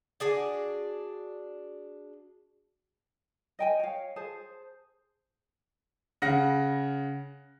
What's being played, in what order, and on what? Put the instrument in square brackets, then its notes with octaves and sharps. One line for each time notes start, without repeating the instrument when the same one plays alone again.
[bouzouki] D4 F#4 G#4 D5
[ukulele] D#5 G5 G#5
C#5 F5
G#4 C5 A5
[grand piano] C#3 F#5 A#6